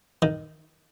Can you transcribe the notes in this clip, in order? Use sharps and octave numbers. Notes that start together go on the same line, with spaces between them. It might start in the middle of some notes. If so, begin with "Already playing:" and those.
D#3